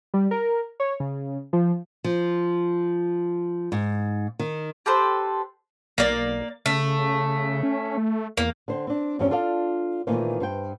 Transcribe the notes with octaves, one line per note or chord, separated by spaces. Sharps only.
G3
A#4
C#5
C#3
F3
F3
G#2
D#3
G4 A4 B4 C5
B1 A#3 D5
C#3 A3
C#4
A3
E2 A#3
D3 C5 G5
C4 D4
E2 G2 F3 G3 C4 C#4
D4 F4 A4 D5 F5
A#2 D#3 E3 A3 A#3 C4
G2 C5 G5